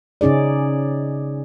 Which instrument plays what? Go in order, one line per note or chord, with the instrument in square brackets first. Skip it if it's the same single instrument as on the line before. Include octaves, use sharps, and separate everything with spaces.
[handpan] C#3 C#4 D#4 G#4 D5